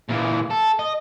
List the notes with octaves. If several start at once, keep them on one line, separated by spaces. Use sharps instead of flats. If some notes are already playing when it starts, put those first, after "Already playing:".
A#2 E3
A4
D#5